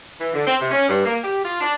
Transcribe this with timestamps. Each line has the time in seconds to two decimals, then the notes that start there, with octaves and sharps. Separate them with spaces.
0.20 E3
0.34 D3
0.46 C4
0.59 C3
0.71 C#4
0.89 G2
1.05 A#3
1.23 G4
1.43 F4
1.60 D4